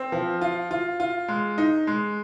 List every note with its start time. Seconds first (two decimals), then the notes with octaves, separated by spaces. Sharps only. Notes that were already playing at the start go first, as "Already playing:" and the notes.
Already playing: C4
0.12 F3
0.41 F4
0.71 F4
1.00 F4
1.28 G#3
1.58 D#4
1.87 G#3